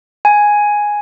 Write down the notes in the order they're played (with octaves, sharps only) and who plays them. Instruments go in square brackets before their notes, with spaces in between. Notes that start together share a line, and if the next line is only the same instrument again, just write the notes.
[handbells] G#5